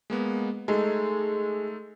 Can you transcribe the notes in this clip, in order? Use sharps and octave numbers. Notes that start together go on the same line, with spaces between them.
G#3 A#3 B3
G#3 A3 D#4 A4